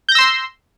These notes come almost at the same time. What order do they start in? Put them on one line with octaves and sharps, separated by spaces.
G6 A#6 E6 C6